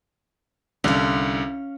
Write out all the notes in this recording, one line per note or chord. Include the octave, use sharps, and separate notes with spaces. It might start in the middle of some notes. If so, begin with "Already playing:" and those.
C2 D3 C#4 F5